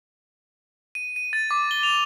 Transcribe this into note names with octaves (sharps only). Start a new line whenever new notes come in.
D#7
D#7
A6
D6
G7
F7